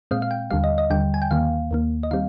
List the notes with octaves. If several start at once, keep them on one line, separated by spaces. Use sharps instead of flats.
A#2 G#3 C4 F5
F5
G5
D#2 D3 G3 F5
D#5
D#5
D#2 D3 G3 G5
G#5
G5
D#2 D#3 A#3 F5
D#2 D#3 A#3
D#5
D#3 G3 C4 F5